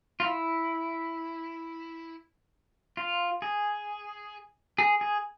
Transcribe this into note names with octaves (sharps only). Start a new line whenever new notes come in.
F4
E4
F4
G#4
G#4
G#4